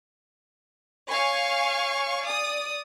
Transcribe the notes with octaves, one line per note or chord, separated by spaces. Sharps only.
C#5 F5 G#5 C#6
D5 D#6